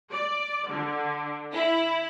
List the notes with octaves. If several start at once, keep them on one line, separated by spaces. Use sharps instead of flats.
D5
D3
E4